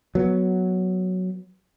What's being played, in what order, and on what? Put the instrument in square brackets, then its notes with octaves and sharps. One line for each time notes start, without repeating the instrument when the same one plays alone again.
[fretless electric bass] F#3 B3